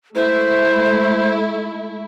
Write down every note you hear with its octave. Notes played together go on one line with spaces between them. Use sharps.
G#3 A3 E4 C5